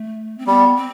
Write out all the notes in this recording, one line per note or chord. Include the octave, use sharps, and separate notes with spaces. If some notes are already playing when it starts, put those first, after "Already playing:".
Already playing: A3
C4
G3 B3
C4